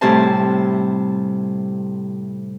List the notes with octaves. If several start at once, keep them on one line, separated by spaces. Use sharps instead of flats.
A2 C3 G3 C5 G#5 A5